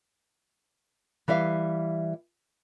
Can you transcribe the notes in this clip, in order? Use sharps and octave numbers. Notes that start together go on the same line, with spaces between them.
E3 G3 E5 F5